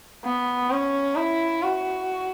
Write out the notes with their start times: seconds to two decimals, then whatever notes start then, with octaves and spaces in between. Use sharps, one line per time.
0.25 B3
0.71 C#4
1.16 E4
1.62 F#4